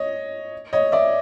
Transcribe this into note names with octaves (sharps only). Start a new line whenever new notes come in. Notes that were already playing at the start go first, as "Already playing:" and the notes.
Already playing: C#5 D#5
C#5 D#5
D5 E5